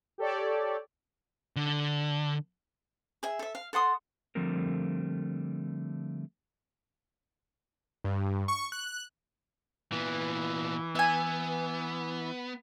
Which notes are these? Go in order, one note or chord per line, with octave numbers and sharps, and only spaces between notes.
G4 A4 C#5 D5
D3
G#4 E5
A4 E5
F5
A4 F#5 C6 D#6
D3 F3 G3 A3 C4 A#4
G2
C#6
F#6
A#2 E3 B3
B3 E5 G#5